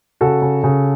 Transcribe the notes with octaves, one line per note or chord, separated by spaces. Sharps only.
C#3 F#4 A4
C#3
C#3